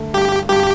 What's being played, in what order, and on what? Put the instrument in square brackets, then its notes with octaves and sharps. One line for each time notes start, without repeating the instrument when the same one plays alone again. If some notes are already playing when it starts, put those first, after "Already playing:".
Already playing: [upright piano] D3 A3
[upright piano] G2 [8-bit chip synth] G4
[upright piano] G2 [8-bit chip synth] G4